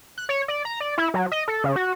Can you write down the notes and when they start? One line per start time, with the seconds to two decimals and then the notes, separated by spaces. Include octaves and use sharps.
0.18 F#6
0.29 C#5
0.48 D5
0.65 A#5
0.80 D5
0.98 E4
1.14 F#3
1.32 D#5
1.48 A4
1.64 C#3
1.76 F#4